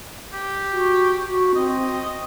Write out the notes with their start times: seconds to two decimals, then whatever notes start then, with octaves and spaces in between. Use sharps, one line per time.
0.33 G4
0.72 F#4
1.28 F#4
1.55 C4 D#5